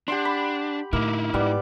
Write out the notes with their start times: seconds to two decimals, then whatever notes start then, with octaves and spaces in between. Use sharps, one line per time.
0.08 D4 G4 F#5 C6
0.25 B5
0.93 A2 D3 A#3 D#4 E4
1.34 G#2 G3 B3 D6